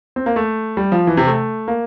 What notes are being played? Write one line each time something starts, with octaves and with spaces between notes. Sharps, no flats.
C4
A#3
A3
G3
F3
E3
C3
A3
A#3